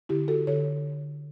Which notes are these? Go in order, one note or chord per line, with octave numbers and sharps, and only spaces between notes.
D3 E4 G4
F#4 A4
D3 A4 C#5